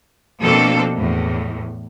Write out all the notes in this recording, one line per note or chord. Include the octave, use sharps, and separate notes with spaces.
B2 F3 A#3 C4 D4 A4
E2 A2